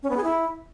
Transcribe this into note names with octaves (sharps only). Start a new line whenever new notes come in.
C#4
B3
G#4
E4